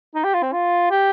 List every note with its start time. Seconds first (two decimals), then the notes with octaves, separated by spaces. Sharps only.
0.15 D#4
0.24 G4
0.34 F4
0.42 C4
0.53 F4
0.90 G4